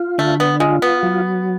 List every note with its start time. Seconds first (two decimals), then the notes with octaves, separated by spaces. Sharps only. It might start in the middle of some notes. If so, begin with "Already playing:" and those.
Already playing: F4
0.18 D3 A3
0.40 B3
0.60 G#3 F4
0.82 B3
1.03 F#3